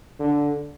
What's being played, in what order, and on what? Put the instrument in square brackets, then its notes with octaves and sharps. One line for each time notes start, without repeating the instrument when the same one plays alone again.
[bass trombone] D3